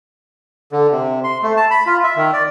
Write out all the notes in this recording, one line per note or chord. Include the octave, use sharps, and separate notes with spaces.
D3
C3
C6
A3
A5
B5
F4
E5
D#3
D5